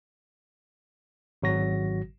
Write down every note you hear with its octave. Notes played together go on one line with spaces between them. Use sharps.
G#1 F#3 F#4 A#6